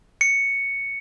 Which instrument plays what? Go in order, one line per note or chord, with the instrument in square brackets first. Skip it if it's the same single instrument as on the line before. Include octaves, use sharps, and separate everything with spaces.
[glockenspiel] C#7